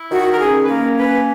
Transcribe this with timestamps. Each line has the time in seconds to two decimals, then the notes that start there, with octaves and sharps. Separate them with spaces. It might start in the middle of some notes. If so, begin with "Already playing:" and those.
Already playing: E4
0.11 D#3 F#4
0.32 A#4
0.40 C#4 G#4
0.64 B4
0.68 A#3 A#4
0.97 C#4 B4